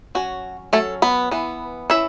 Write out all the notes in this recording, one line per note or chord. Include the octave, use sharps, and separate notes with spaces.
F#3 C#4 F#4
F#3 A3 C#4 A4
B3 B4
E3 B3
E3 C#4 E4 E5